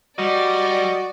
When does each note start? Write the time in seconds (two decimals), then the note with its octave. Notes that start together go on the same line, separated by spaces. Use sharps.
0.18 G3 F#4 D5 D#5